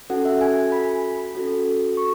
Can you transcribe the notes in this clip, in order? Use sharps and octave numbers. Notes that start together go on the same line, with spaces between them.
C#4 F#4 A4 F#5
E5
G#5
G#5
B5
C#4 F#4 A4
C#6